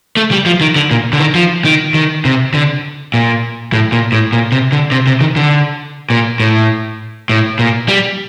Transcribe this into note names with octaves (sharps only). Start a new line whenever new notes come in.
A3
G3
F3
D#3
D3
A#2
D3
D#3
F3
D#3
D#3
C3
D3
A#2
A2
A#2
A2
A#2
C3
D3
C3
C3
D#3
D3
A#2
A2
A2
A#2
G3